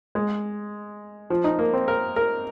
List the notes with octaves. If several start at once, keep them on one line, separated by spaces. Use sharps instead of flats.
G#3
F3
D#4
A#3
C4
A#4
A#4